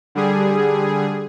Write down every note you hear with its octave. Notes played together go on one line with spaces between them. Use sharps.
D3 G3 G#4